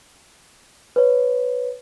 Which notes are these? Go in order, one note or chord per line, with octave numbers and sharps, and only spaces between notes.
B4 C#5